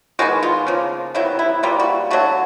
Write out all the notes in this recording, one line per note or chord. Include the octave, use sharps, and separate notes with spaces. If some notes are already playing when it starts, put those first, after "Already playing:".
D#3 G#3 B3 F#4
F4
C#3 F3 A#3
C3 D#3 F#3 B3 E4
E4
B2 G3 A#3 F4
F#4
D3 F#3 A3 F#4